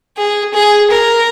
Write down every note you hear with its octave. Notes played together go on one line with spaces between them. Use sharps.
G#4
G#4
A#4